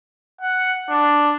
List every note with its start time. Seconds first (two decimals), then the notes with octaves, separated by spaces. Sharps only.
0.41 F#5
0.90 D4